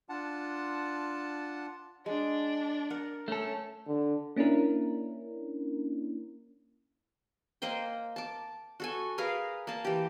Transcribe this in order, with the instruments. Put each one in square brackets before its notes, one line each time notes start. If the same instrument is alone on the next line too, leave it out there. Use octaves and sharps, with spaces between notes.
[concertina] D4 F4 F#5 A5
[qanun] G#3 [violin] D4
[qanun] A#4 F#5
[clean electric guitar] A3 A4 [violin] C#4
[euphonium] D3
[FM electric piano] A#3 C#4 D4 E4 A#4
[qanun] A#3 C5 D#5 G5
A5 D6
F#4 A4 G#5
G#4 A#4 B4 F5
A#3 A5
E3 G4